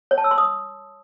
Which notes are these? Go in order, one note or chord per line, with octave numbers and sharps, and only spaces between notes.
C#5
A5
E6
C6
D#6